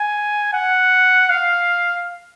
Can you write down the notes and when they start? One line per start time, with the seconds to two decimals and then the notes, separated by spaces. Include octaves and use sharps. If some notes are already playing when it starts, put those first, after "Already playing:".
Already playing: G#5
0.53 F#5
1.30 F5